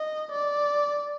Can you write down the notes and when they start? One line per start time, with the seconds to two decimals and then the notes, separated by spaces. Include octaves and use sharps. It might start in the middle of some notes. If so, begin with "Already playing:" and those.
Already playing: D#5
0.32 D5